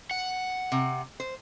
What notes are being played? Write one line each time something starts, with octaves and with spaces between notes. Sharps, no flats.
F#5
C3
C5